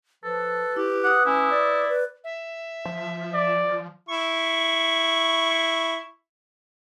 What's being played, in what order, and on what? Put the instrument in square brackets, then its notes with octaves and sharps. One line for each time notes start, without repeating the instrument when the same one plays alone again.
[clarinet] F3 [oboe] A4 [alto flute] B4
[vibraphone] E4 [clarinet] G4
[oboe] F#5 [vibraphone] D6 D#6
[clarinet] C#4 [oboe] E4
[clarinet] D5
[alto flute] B4
[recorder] E5
[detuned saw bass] F3
[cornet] D5
[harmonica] E4 C#6